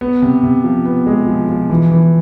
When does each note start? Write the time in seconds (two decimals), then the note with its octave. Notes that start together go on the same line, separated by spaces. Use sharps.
0.01 B3
0.22 C3
0.43 C3
0.64 F3
0.85 B3
1.06 G#3
1.28 F3
1.49 F3
1.70 E3
1.91 E3